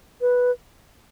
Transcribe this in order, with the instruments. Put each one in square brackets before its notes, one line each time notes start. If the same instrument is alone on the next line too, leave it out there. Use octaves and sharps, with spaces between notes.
[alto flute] B4